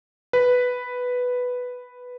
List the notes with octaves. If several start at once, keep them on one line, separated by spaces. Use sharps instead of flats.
B4